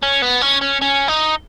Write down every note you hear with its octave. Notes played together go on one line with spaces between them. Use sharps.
C#4
B3
C#4
C#4
C#4
D#4